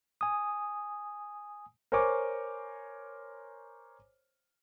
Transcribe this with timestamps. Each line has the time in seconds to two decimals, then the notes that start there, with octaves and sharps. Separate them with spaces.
0.21 G#5 D#6
1.92 A#4 C5 C#5 G#5 C#6 D6